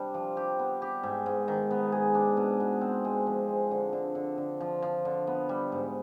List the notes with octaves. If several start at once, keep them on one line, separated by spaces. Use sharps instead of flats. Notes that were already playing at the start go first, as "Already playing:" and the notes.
Already playing: C3 G3 D4
F3
G4
B3
G4
G#2
G#2
D#3
B3
G#4
D4
B2
B2
C4
G#3
F3
G#3
D3
D3
D3
D3
F3
F3
D3
B3
G3
G#2